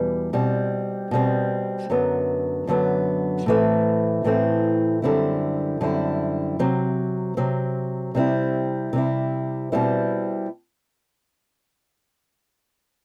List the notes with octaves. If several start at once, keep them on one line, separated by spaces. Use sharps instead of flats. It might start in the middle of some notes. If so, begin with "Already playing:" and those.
Already playing: E2 B2 G3
B2 G3 C4
B2 G3 C4
F#2 D3 F#3 B3
F#2 D3 F#3 B3
A2 E3 A3 C4
A2 E3 A3 C4
F#2 D3 G3 C4 E4
F#2 D3 G3 C4 E4
C3 F#3 C4
C3 F#3 C4
C3 G3 C4 E4
C3 G3 C4 E4
B2 G3 C4 E4